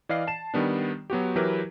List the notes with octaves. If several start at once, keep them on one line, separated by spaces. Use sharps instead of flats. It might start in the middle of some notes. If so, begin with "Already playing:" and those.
E3 D5 D#5 F5 F6 C7
A5 E7
D#3 G3 B3 D4
F#3 B3 F#4 G4
E3 F#3 E4 G4 A#4 B4